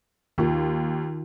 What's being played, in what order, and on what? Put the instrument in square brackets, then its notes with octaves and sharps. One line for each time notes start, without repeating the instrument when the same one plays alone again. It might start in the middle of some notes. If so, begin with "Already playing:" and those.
[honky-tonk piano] D#2 [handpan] D#3 F4